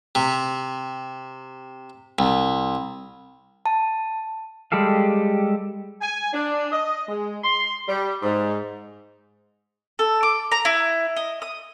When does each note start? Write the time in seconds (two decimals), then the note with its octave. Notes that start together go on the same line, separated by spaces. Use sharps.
0.15 C3
2.19 C2
3.66 A5
4.72 G3 G#3 G4 A4 F5
6.01 G#5
6.34 D4
6.72 D#5
7.09 G#3
7.43 C6
7.87 G3
8.23 G#2
9.99 A4
10.23 D6
10.52 A#5
10.65 E4
11.16 D#5
11.42 D#6